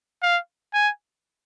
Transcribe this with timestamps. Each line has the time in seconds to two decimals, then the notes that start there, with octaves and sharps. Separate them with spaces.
0.22 F5
0.74 G#5